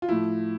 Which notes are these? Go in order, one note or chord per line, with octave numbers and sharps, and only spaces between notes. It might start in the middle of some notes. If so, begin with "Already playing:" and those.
F4
A2 F3 E4